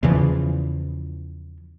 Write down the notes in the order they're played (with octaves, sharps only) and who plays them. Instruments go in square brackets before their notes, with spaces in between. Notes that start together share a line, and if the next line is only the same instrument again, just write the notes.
[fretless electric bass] E2 C#3 E3 F3